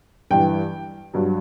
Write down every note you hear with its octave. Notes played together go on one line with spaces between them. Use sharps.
G2 E3 G5
G2 F#3